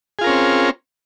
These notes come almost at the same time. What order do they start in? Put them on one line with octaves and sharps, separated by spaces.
G#4 F4 A#4 C#4 C4